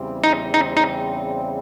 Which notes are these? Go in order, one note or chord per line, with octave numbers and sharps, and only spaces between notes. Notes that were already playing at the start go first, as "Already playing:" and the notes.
Already playing: E2 C#3 E3 G3 C4
D#4
D#4
D#4